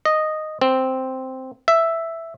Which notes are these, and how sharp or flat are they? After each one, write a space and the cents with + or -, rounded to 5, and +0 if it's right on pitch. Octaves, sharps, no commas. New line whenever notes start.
D#5 -5
C4 -5
E5 +5